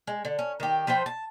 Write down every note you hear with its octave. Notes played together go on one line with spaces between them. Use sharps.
G#3
D3
C#4
D#3 G4
F3 B4 C5 G5
A5